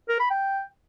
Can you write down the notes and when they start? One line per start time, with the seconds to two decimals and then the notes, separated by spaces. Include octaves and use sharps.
0.09 A#4
0.20 B5
0.31 G5